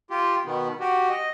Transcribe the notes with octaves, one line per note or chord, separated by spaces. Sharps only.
F4 G4
B2 D#3 B3
F#4 G4
D#5